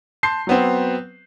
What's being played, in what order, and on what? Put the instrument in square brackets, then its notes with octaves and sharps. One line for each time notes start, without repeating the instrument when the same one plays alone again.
[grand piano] A5 C6 G6 C7
F#3 B3 C4